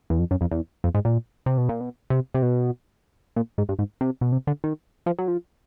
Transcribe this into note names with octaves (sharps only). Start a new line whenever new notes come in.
E2
F2
F#2
F2
E2
F2
G#2
A#2
C3
B2
A#2
B2
C3
C3
B2
A#2
G#2
G2
G#2
C3
B2
C3
D3
D#3
F3
F#3
F3